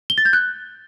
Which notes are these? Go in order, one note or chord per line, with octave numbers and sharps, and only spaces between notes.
G7
A6
G6
F#6